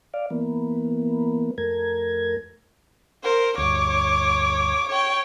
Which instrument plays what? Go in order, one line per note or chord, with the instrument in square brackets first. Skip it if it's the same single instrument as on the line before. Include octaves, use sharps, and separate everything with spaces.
[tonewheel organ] D5 F5
E3 A#3 B3
F2 A3 A#4 G#6
[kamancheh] A#4 C5
[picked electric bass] D2 G2 [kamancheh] C#5 D6
[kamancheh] C#5 G5